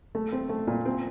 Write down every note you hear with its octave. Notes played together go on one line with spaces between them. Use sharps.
A3
C4
A3
A#2
C4